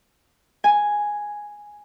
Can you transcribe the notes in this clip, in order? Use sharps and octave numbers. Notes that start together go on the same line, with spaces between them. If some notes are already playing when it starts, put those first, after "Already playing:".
G#5